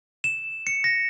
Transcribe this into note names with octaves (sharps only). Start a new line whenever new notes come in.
E7
C#7
A#6